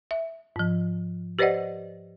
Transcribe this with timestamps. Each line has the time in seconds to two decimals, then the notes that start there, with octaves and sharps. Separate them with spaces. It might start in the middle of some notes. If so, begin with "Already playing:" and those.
0.11 E5
0.56 G#2 F3
1.39 G4 B4 C5 D5 D#5 F#5